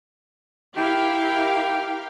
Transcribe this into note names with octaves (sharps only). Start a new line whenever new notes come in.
E4 G4 A#4 F5 G5